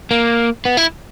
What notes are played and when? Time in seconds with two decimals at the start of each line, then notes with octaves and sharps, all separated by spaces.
0.11 A#3
0.65 B3
0.77 E4